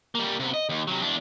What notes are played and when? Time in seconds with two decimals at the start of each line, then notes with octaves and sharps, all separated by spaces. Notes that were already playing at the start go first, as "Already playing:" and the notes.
0.15 G3 A#3
0.40 C3 B3
0.54 D#5
0.69 D#2
0.87 C3 F#3
1.01 E2 D4